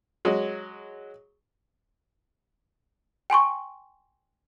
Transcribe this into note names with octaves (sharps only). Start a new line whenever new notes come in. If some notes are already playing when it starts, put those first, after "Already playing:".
F#3 G#3
G5 G#5 C6 C#6